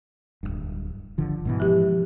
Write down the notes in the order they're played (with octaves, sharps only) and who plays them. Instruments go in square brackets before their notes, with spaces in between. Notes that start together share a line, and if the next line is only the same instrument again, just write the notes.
[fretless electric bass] D1 G#1 G2
G1 D3 F3
G#2 B2 E3
[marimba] F3 G4